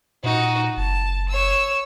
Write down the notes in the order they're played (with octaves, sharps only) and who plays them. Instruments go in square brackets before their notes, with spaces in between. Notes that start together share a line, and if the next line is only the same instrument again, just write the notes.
[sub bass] A#2 [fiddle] D#4 F#4
[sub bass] F#1 [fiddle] A5
[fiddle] C#5 E6